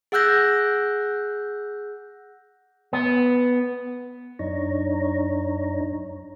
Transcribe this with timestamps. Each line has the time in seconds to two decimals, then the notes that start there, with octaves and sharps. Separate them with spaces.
0.12 G#4 F#5 E6 F#6 G6 A#6
2.93 B3
4.39 F#2 D4 D#4 C#5 A#5